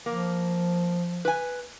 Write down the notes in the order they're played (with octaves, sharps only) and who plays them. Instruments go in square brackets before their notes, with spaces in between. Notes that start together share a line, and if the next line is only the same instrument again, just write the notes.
[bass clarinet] F3 [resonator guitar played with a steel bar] A#3
[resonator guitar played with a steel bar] B4 G#5